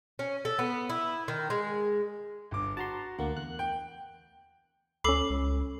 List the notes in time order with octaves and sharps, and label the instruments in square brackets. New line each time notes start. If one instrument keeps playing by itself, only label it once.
[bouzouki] C#4
A4
B3
E4
D#3
G#3
[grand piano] G1 D6
[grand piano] F#4 [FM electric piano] A5 A#5 C6
[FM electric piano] D2 A#3 [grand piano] F#5
[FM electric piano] E2 F#6
[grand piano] G5
[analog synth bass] D2 [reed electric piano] C#4 B5 [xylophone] A4 D6 C7
[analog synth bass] C#2